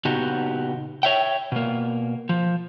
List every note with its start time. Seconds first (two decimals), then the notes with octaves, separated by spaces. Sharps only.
0.05 A#2 C#3 B3 D#4 F#4 G4
1.03 C#5 E5 G5
1.52 B2 A#3
2.29 F3